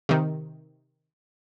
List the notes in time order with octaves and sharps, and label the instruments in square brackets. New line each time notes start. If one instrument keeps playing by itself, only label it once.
[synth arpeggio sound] C3 D#3